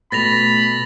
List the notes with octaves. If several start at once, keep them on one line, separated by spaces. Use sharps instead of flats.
B2 A3 B5 A6 A#6 F7